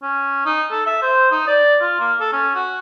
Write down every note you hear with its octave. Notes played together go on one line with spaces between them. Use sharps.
C#4
D#4
A4
E5
C5
D#4
D5
F4
A#3
A4
C#4
F#4